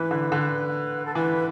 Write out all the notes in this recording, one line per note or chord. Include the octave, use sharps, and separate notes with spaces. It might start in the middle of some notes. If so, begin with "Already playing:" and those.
Already playing: E3 B4
D3
D3
A4
E3 B4